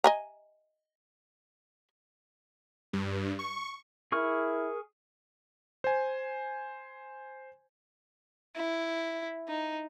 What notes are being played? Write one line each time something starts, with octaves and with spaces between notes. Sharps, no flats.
D#5 G#5 A#5
G2
C#6
E4 G#4 A#4 C#6 F6
C5 G#5
E4
D#4